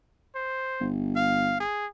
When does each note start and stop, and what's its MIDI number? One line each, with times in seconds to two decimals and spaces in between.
0.35 0.88 72
0.81 1.62 31
1.16 1.59 77
1.60 1.86 68